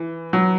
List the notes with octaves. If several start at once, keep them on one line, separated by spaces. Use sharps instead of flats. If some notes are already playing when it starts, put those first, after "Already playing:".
Already playing: E3
F#3